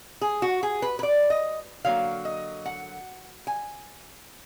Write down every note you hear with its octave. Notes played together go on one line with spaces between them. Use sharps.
G#4
F#4
G#4
B4
B4
D5
D#5
D3 F#3 A#3 F5
D#5
F#5
G#5